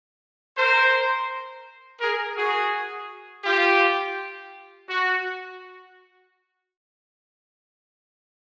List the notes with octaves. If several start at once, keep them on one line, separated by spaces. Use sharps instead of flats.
A#4 C5
G#4 A#4
F#4 G#4
F4 G4
F#4